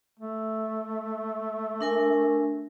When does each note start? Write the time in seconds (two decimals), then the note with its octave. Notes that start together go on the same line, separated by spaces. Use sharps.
0.20 A3
1.81 D4 A#4 G#5